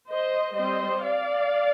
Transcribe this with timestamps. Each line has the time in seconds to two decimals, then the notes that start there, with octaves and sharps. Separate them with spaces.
0.09 C5 D#5
0.55 G3 C4 C5 D#5
1.03 D5 F5